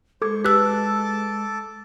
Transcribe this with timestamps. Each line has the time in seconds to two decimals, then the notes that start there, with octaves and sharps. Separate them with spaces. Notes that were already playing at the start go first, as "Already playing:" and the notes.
0.22 G#3 A4 C5 C#6 D6 G#6
0.45 G4 A4 B4 A5 D6 E6 F#6